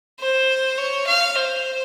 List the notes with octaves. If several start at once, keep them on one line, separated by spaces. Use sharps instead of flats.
C5
C#5
F5
C5